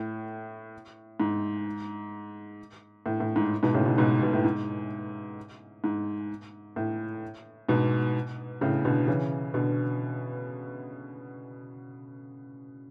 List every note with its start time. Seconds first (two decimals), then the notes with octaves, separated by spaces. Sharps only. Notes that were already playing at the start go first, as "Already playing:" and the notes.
Already playing: A2
1.20 G#2
3.06 A2
3.20 A2
3.36 G#2
3.63 G#2 B2
3.75 A2 C#3
3.86 G#2 B2
3.98 G#2 B2
4.23 B2
4.33 A2
4.44 G#2
5.84 G#2
6.76 A2
7.69 G#2 B2
8.61 A2 C#3
8.85 B2 D3
9.08 C#3 E3
9.54 B2 D3